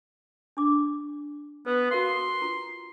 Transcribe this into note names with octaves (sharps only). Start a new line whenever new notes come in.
D4 D6
B3 B4
F#4 A#4 F5 C6
F4